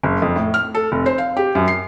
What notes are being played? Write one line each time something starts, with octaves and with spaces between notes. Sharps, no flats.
F#1
F2
A2
F6
A4
F1
C5
F5
G4
F#2
C7